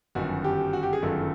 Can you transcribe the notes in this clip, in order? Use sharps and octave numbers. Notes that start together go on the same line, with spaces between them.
G1 F#2 D#3 F#4
G4
F#4
G4
G#4
G1 F#2 D#3 A4